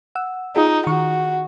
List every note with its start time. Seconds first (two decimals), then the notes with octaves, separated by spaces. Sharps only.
0.15 F#5 E6
0.56 D#4 F4 G#4
0.87 D#3 F#4 C#6